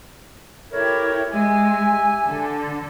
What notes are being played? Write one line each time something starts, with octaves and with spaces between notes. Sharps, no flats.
E4 G4 A4 A#4 C#5
G#3 G4 E5 G#5
D3 A4